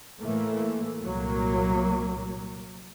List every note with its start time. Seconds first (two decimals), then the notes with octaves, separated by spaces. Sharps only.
0.21 A2 E3 A3 A#3
1.03 C2 A#2 F#3 A#3